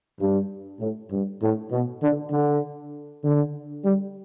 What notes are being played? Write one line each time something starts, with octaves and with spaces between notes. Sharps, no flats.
G2
A2
G2
A2
B2
D3
D3
D3
G3